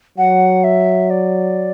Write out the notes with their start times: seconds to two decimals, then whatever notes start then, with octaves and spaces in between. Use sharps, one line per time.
0.18 F#3 F#5
0.64 E5
1.10 D5